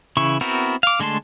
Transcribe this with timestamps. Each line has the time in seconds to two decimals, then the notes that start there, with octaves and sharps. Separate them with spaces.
0.17 C#3 E3 E4 C#6
0.41 B3 C4 E4 F#4 A#4
0.83 F5 D6
1.00 D3 G#3 A3 A5 C6